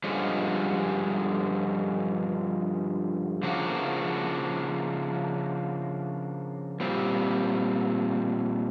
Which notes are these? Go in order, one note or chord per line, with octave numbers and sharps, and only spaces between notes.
G2 D3 F3 G#3 C#4
C#3 F3 A#3 D4 F#4
A#2 G3 C4